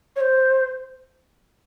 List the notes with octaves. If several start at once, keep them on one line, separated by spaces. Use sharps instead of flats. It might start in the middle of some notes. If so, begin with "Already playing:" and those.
C#5
C5